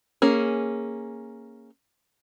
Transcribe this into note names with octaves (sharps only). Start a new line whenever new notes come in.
A#3 C#4 G#4